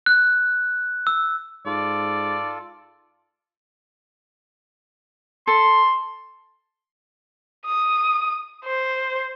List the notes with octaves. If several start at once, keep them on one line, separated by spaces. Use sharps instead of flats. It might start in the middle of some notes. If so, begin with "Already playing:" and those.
F#6
E6
G#2 F4 A4 D5
A4 C6
D#6
C5